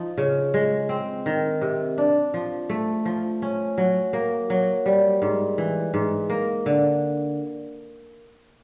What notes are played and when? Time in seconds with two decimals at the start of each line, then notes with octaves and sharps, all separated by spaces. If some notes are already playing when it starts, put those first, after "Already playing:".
Already playing: F3 D#4
0.18 C#3
0.54 G#3
0.89 C4
1.26 D#3
1.61 C3
1.98 D4
2.34 F3
2.69 A3
3.05 F3
3.42 C#4
3.78 F#3
4.13 A#3
4.50 F#3
4.86 G3
5.22 G#2
5.58 E3
5.94 G#2
6.30 A#3
6.66 D3